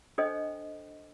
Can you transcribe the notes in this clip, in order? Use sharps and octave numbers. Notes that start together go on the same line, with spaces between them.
D4 A4 C5 D#5 G5